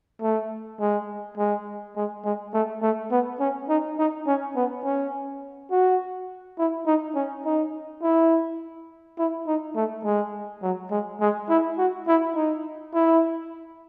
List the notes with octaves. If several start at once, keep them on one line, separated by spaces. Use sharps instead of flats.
A3
G#3
G#3
G#3
G#3
A3
A3
B3
C#4
D#4
D#4
C#4
B3
C#4
F#4
E4
D#4
C#4
D#4
E4
E4
D#4
A3
G#3
F#3
G#3
G#3
E4
F#4
E4
D#4
E4